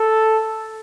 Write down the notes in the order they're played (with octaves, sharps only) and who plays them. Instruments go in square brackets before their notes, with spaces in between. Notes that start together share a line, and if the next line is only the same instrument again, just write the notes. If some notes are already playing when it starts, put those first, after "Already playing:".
Already playing: [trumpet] A4